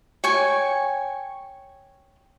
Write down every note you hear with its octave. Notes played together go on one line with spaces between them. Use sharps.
C#5 G5 G#5 C#6